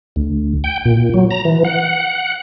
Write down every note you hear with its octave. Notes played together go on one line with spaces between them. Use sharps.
D2
G5
A#2
F#3
A#5
E3
F#5